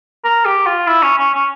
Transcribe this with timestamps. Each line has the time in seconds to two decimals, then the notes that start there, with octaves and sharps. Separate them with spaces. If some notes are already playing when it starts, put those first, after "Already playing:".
0.24 A#4
0.45 G4
0.66 F4
0.87 E4
1.03 C#4
1.18 C#4
1.34 C#4